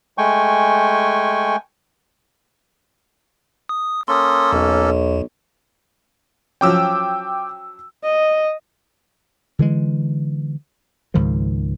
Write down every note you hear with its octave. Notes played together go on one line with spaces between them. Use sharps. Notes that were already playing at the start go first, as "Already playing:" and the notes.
G#3 A3 G5 G#5 C#6
D#6
A#3 C#4 A4 C6 D#6
B1 E2
F3 F#3 C#4 G5 D6 E6
D#5
D3 E3 G#3
C#2 G#2 D#3 F3